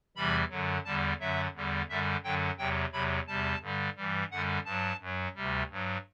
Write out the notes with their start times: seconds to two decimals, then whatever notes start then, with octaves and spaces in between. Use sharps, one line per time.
0.16 E2 C3 E3 G3 B5
0.50 F#2 D3 F#3
0.85 E2 D3 G3 A5
1.19 F#2 D3 F#3 E5
1.55 E2 D3 G3
1.88 F#2 D3 G3 E5
2.23 F#2 D3 F#3 G5
2.58 E2 C3 F#3 G5
2.92 E2 C3 F#3 B5
3.27 E2 C3 G3 A5
3.61 G2 D3 G3
3.96 G2 E3 G3
4.30 F#2 D3 G3 F#5
4.65 G2 F#3 A5
5.00 F#2 F#3
5.35 D2 C3 G3
5.70 G2 F#3